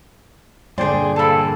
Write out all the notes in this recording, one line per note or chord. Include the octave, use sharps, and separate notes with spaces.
G2 A#2 D3 G#4 C5 D5 G5 C6
E3 A#3 A4 A5 B5